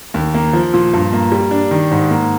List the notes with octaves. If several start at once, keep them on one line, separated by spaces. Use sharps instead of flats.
D#2
A#3
F3
A#2
G2
A#3
G3
D4
D#3
G#2
A#3